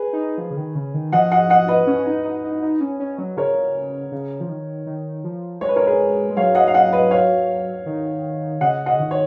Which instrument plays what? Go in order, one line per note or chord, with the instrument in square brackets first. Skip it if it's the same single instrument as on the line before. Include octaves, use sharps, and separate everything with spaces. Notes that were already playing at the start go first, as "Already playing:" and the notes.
Already playing: [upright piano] G#4 B4
[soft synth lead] D#4
F3
C#3
D#3
C#3
D#3
[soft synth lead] F3 [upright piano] D#5 F#5
[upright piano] D#5 F#5
D#5 F#5
B4 D#5
[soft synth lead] C#4
C#4
D#4
D#4
D#4
D#4
C#4
C#4
F#3
[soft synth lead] C#3 [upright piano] A#4 C#5
[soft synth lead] C#3
F3
D#3
D#3
F3
[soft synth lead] G#3 [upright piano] C#5
[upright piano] B4
A#4 C#5
G#4 B4
[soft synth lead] G#3
[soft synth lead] F#3 [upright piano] C#5 F5
[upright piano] D#5 F#5
F5
D#5 F#5
B4 D#5
C#5 F5
[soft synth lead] D#3
[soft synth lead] C#3 [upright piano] D#5 F#5
[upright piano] D#5 F#5
[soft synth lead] C#3
D#3
[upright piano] C#5